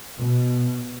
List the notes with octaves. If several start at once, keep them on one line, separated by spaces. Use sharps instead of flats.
B2